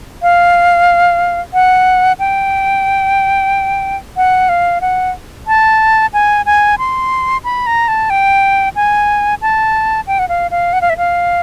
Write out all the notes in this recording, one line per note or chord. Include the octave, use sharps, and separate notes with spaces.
F5
F#5
G5
F#5
F5
F#5
A5
G#5
G#5
C6
B5
A#5
A5
G5
G#5
A5
G5
F#5
F5
F5
F#5
F5
E5
F5